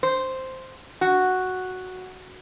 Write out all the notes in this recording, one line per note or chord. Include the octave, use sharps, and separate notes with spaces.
C5
F#4